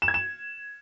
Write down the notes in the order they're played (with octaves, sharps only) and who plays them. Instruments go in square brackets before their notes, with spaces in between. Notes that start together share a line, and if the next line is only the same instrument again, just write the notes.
[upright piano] E7
G#6
E7